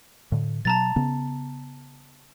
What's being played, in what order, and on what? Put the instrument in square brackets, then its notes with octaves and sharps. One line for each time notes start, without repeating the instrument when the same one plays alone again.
[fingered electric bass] A2 D3
[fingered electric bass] B2 F#3 [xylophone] A5 A#5 A6
[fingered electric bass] C#3 B3